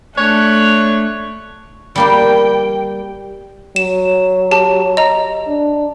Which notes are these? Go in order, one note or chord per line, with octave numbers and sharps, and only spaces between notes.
A3 D4 C#5 F#6
G3 A#3 G4 G5
F#3 E7
G4 A5
D#5 A#5
D4